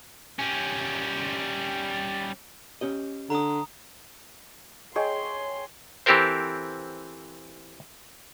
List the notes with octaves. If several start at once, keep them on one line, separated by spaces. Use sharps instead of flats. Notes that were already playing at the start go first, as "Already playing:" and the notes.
G3 C#4
C#4 G4 D#5
D3 A#5 D#6
G#4 C#5 D#5 G5 C6
E3 C4 G4 A4 A#4 C5